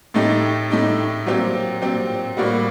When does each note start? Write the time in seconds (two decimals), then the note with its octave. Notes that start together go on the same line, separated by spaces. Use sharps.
0.14 A2 A3 D#4 G4
0.71 A2 A3 D#4 G4
1.26 A#2 F#3 C4 G4
1.82 A#2 F#3 C4 G4
2.37 A2 G3 A#3 F#4